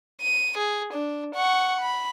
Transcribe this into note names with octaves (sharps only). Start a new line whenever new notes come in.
D#7
G#4
D4
F#5 C#6
B5